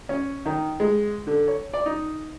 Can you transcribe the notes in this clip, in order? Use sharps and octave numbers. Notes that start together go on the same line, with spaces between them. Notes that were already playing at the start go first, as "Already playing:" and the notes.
C#4
D#3
G#3
D3
C#5
D5
D#4